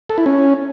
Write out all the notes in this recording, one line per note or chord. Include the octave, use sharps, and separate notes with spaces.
A4
E4
C#4